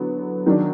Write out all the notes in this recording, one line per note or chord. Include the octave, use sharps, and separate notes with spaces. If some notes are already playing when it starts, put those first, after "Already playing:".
Already playing: D3 F#3 B3
D#3 F#3 D4